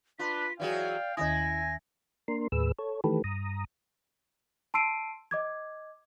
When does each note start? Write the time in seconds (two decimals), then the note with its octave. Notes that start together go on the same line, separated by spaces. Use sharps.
0.19 D4 F4 B4 B6
0.60 E3 F#3 G#4 D5 F5 G5
1.17 D#2 D#3 E4 G#5 D#6 A#6
2.28 A#3 D4 A#4 C6
2.52 D#2 A2 G#4 B4 E6
2.79 A4 C#5
3.04 D#3 E3 A3 G4 A4 B4
3.24 G2 A#5 D#6
4.74 A5 C6 E6 C7 D7 D#7
5.31 D#5 D6 G#6